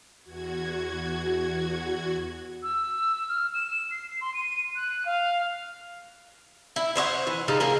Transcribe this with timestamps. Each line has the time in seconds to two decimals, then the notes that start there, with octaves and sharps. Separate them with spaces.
0.24 E2 F#4 G#6
2.63 E6
3.29 F6
3.54 E7
3.91 C7
4.21 C6
4.34 D#7
4.75 F#6
5.05 F5
6.76 E4
6.96 C5 C#5 D#5 F#5
7.27 E3
7.48 C#3 F3 D#4 A4
7.60 A#3 G#4 A#4